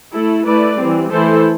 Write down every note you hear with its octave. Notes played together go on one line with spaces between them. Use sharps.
A3 E4 A4
A3 E4 B4 D5
E3 G3 C4
E3 A3 E4 A4 C5